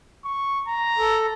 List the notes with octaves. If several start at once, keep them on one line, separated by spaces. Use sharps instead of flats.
C#6
A#5
A4